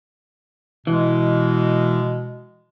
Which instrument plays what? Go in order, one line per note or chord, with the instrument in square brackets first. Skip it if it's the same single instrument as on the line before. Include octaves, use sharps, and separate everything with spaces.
[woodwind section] B2 G#3 [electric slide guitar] E3